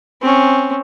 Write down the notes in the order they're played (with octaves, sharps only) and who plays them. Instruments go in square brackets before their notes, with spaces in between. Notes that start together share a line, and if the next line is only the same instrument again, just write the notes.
[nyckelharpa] C4 C#4